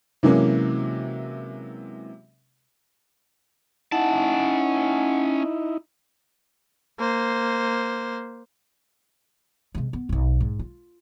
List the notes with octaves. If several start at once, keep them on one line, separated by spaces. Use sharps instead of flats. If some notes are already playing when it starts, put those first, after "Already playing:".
C3 E3 F#3 G#3 A#3 C#4
C#4 D#4 E4 F#5 A5
A#3 C5
C3 G#3
B3
D1 B1
G#2
F4